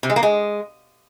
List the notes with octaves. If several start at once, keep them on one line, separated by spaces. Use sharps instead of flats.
C3
G#3
A#3
G#3